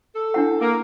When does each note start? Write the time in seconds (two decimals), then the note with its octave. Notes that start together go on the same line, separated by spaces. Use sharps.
0.15 A4
0.34 D4 E4 F#5
0.61 A#3